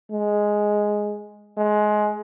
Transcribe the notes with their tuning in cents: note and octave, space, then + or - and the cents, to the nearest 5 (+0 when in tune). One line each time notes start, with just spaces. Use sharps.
G#3 +0
G#3 +20